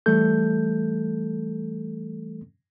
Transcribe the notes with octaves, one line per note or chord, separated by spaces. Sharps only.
E3 G3 A3 A4 G6